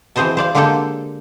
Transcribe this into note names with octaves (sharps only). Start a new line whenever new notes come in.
E3 C4 G#4 C5 D#5 A5
C5 D5 F5
D3 G#3 A#3 D4 G4 A4